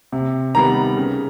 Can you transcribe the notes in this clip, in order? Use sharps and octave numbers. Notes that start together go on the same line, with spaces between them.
C3
D#3 G3 B3 A#5
C#3